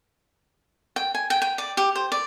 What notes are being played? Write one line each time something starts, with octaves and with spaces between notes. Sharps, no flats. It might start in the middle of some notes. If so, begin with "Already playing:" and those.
G5
G#5
G5
G5
D5
G4
C5
D5